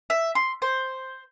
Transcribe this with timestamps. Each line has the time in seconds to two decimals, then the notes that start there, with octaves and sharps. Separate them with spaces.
0.10 E5
0.35 C6
0.62 C5